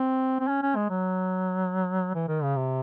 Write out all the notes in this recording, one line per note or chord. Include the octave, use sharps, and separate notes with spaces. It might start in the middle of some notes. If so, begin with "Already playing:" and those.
Already playing: C4
C4
C#4
C#4
G#3
F#3
E3
D#3
C#3
C3